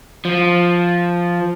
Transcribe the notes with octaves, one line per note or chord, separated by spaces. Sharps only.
F3